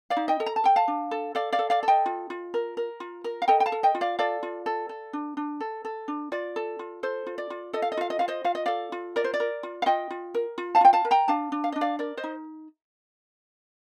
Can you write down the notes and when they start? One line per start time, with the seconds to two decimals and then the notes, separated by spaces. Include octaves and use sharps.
0.10 D5 F5
0.17 D#4
0.28 D#5 G5
0.40 A4
0.46 A#5
0.56 A5
0.64 A4 G5
0.76 F5 A5
0.88 D4
1.11 A4
1.35 A4 D5 F5
1.52 D5 F5
1.59 A4
1.70 D5 F5
1.83 A4
1.88 D#5 G5
2.06 F4
2.30 F4
2.54 A#4
2.77 A#4
3.00 F4
3.24 A#4
3.42 F5
3.48 A4 D#5 G5
3.60 G5
3.66 F5 A5
3.72 A4
3.83 D#5 G5
3.95 F4
4.01 D5 F5
4.19 A4 D5 F5
4.43 F4
4.66 A4
4.89 A4
5.13 D4
5.37 D4
5.60 A4
5.85 A4
6.08 D4
6.32 F4 D5
6.56 A4
6.79 F4
7.03 A4 C5
7.27 F4
7.38 D5
7.50 F4
7.73 A4 D#5
7.82 F5
7.92 D#5
7.97 F4 F5
8.10 D#5
8.19 F4 F5
8.28 C5 D#5
8.44 F4 F5
8.55 D#5
8.66 A4 D5 F5
8.92 F4
9.16 A#4 D5
9.24 C5
9.34 D5
9.40 A#4
9.63 F4
9.82 F5
9.86 F4 D#5 G5
10.11 F4
10.35 A#4
10.58 F4
10.75 F5 A5
10.81 F4 G5
10.93 F5 A5
11.05 A#4
11.11 G5 A#5
11.28 D4 F5 A5
11.52 D4
11.64 F5
11.72 D4 D#5
11.81 D5 F5
11.99 A#4 D5
12.17 C5 D#5
12.24 D#4